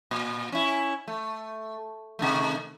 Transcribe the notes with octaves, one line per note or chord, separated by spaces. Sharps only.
A#2
C#4 E4
A3
C3 D#3 A3